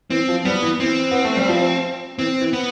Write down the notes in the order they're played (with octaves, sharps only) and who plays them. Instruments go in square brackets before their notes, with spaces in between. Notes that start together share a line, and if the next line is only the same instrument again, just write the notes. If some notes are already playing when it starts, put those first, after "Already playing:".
[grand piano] E3 [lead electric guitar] C4
[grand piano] F3
[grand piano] G3 [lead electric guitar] B3
[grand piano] E3
[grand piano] E3 [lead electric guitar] C4
[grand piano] B3
A3
G3
F3
[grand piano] E3 [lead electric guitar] C4
[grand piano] E3
[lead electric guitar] B3